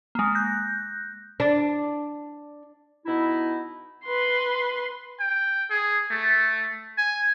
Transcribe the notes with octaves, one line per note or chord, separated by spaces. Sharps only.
G#3 A#3
F#6 G6 A#6
D4
B2 D#4 E4
B4 C6
G5
G#4
A3
G#5